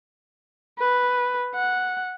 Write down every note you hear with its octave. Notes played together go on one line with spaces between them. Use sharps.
B4
F#5